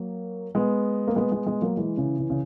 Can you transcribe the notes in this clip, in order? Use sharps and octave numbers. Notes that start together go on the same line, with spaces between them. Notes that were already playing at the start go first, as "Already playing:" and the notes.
Already playing: F#3 A#3
G#3 B3
A#3
G#3 B3
G#3 B3
G#3 B3
F#3 A#3
E3 G#3
C#3 E3
C#3 E3
C#3